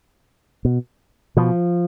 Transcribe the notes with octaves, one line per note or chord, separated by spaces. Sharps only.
B2
B2 F3